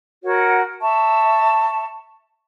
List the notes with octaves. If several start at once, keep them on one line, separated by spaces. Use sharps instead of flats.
F#4 A#4 C#5 F#5
E5 A5 C#6